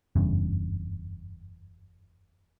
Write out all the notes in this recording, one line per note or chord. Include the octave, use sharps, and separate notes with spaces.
F#1 E2 G2 C#3